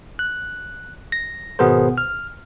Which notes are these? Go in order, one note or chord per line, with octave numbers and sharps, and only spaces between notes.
F#6
A#6
G#1 B2 B3 G#4 A#4 C5
F6